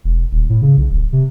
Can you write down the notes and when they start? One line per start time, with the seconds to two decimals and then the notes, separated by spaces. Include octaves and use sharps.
0.04 E1
0.31 D#1
0.49 A2
0.62 C#3
0.77 B1
0.90 D1
1.13 C3